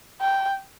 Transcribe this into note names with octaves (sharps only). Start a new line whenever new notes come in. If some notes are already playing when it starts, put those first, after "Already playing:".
G5